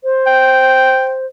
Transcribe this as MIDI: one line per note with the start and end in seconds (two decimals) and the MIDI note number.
0.04 1.26 72
0.27 1.13 79